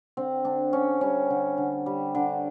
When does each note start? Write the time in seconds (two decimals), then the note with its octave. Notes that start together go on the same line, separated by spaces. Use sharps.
0.17 D3 C4
0.45 D3 D4
0.73 D3 C#4
1.01 G3 C#4
1.30 D3
1.58 D3
1.86 G3
2.15 D3